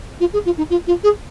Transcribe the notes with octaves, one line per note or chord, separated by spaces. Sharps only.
F4
G#4
F4
D#4
F4
F4
G#4